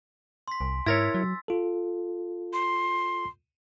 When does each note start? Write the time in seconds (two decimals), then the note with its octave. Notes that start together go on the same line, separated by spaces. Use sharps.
0.48 C6 B6
0.61 C2 G#5
0.86 G#2 E4 A#4 C#5 E6 A6 B6
1.14 F#3
1.48 F4 A4
2.53 C6